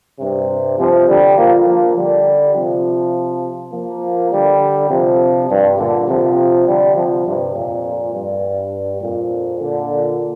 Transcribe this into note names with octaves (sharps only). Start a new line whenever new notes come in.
G2 C3
C3 F3
D3 G3
F3 A#3
F3 A#3
D3 G3
C3 F3
F3 A#3
D3 G3
C3 F3
G2
A#2 D3
C3 F3
D3 G3
C3 F3
G2 C3
F2 A#2
G2
F2 A#2
A#2 D3